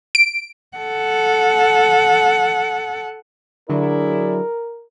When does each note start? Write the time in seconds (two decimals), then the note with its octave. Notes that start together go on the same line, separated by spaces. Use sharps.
0.15 D7
0.77 A4 F#5
3.70 D3 F#3 E4 G#4 A#4 D5